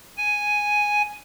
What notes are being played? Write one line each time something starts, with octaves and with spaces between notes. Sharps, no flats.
G#5